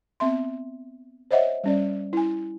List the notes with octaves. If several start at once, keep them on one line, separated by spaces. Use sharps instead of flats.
B3 C4 E5 C6
C5 C#5 D#5 E5 F#5
G3 C#4 D5
E4 G#5